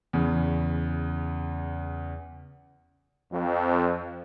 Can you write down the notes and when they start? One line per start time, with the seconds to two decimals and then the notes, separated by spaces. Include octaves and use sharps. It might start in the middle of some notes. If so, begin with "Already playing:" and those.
0.13 E2 C#3
3.32 F2